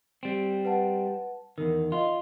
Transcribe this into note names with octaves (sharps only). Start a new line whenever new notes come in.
G3 C4
B4 F#5 A5
E2 D#3 A#4
F4 D#5 C6